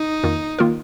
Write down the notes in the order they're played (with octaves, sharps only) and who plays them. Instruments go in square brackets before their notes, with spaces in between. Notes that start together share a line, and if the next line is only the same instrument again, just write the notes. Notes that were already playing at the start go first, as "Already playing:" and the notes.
Already playing: [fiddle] D#4
[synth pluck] F2 D#3 A#3 F4 A#4
D#3 A#3 F4 A#4